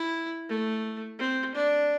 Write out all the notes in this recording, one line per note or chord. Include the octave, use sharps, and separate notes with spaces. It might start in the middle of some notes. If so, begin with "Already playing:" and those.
Already playing: E4
A3
C4
D4